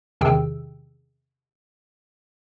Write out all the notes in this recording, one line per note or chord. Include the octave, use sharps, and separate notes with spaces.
E2 C3 D#3 G#4 G5 E6